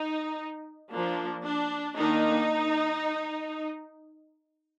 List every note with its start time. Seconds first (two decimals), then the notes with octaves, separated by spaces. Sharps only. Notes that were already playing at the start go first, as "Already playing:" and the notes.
Already playing: D#4
0.91 F3 A#3 D4
1.44 D4
1.96 D#3 A#3 D4 D#4